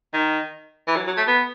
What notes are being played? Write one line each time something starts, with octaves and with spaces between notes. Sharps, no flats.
D#3
E3
F#3
F#3
A3
B3